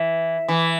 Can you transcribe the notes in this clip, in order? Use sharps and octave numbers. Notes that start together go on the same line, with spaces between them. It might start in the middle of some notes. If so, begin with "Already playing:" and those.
Already playing: E3
E3